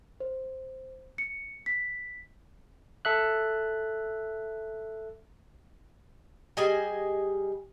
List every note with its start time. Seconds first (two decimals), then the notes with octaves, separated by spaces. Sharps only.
0.20 C5
1.18 C#7
1.66 B6
3.05 A4 E5 F#6
6.57 G3 G#4 D#5 G#5